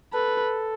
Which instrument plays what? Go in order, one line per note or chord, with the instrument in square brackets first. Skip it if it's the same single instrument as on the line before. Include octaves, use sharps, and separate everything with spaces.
[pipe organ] A4 [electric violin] B4